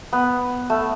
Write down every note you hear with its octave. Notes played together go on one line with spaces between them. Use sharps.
B3
A3